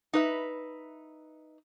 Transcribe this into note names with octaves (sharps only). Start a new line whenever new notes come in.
D#4 B4 E5